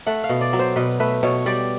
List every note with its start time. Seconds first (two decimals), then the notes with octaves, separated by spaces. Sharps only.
0.06 A3 F#5
0.24 F5
0.29 B2
0.41 D5
0.53 F#3
0.59 C5
0.76 B2 B4
1.00 A3 B4
1.23 B2 C#5
1.46 G3 D5